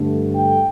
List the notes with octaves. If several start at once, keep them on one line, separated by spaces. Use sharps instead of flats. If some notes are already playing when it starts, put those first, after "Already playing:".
Already playing: G2 D3 A3
G5